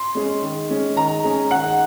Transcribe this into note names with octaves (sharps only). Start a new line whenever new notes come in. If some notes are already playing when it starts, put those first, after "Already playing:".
Already playing: C6
G#3 C#4 G#4
D#3
G#3 C#4 G#4
D#3 A#5
G#3 C#4 G#4
D#3 F#5